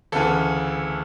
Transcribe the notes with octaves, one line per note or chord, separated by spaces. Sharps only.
D2 C#3 E3 A4